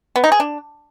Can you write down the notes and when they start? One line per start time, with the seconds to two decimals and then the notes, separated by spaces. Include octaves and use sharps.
0.16 B3
0.24 D#4
0.32 G#4
0.40 D4